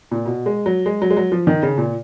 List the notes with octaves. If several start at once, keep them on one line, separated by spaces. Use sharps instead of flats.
A#2
B2
G#3
F#3
G#3
F#3
G#3
F#3
F3
D#3
C#3
A#2